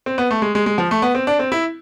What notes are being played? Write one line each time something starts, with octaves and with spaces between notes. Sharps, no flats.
C4
B3
A3
G#3
G#3
G#3
F3
A3
B3
C4
D4
C4
E4